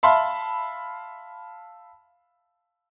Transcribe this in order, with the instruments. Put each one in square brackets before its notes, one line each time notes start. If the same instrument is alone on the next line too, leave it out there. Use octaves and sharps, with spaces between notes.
[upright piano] E5 F5 A5 B5 C6